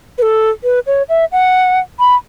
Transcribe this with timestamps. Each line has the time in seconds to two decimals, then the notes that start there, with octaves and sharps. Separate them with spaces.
0.18 B4
0.22 A4
0.64 B4
0.87 C#5
1.09 E5
1.32 F#5
2.00 B5